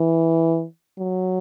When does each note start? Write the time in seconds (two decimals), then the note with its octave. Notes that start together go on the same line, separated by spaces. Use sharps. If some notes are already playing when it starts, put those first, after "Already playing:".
Already playing: E3
0.98 F#3